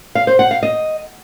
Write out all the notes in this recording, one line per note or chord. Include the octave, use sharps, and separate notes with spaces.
F5
C5
F#5
F5
D#5